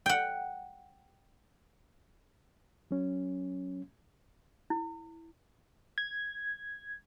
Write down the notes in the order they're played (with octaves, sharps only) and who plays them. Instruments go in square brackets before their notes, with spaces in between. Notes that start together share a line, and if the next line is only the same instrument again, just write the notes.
[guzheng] F#5 G5
[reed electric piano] F#3 C#4
[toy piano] E4
[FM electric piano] G#6